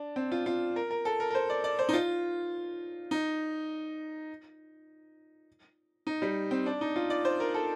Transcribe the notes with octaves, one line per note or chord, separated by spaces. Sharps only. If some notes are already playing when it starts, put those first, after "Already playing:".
Already playing: D4
C4
F4
F4
A#4
A#4
A4
A#4
A#4
C5
D5
D5
C5
D#4
F4
D#4
D#4
G3
C4
D4
D#4
F4
D5
C5
A#4
A4